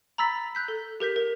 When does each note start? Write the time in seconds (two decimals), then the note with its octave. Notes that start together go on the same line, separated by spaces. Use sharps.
0.18 A#5 B5 E6 A6 B6
0.55 F#6 G6 B6
0.68 A4
1.00 G4 A#4 G6 B6
1.16 A#4